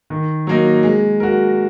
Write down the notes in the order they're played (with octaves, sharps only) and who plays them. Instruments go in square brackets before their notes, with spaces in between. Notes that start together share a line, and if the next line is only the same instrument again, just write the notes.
[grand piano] D#3
F#3 A#3 D#4
G#3
F#4 A#4